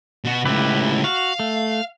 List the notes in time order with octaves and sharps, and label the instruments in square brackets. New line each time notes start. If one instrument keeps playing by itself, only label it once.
[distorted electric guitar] B2 F#4
[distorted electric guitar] C#2 A2 [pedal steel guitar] E4 G4 B4
[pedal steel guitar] F#4 [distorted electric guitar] F5
[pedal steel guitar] A3